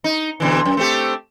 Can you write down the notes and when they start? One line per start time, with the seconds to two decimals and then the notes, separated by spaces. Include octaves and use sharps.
0.04 D#4
0.40 B2 D3 E3
0.65 F#2
0.77 A3 C4 G4